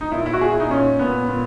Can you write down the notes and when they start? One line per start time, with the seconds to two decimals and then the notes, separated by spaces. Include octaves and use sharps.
0.01 D#4
0.12 A#2 E4
0.26 E4
0.33 F#4
0.41 A#2 G#4
0.51 E4
0.60 D#4
0.70 A#2 C#4
0.99 A#2 B3
1.28 A#2